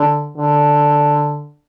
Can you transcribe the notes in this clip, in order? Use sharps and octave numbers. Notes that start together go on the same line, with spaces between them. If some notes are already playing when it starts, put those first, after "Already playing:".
Already playing: D3
D3